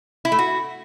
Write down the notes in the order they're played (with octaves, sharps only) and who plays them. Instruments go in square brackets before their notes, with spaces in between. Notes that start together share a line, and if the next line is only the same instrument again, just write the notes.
[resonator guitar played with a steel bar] E4
A3
F#4